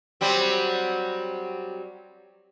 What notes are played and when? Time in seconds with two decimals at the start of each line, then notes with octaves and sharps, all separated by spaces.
0.21 F#3 G3 C4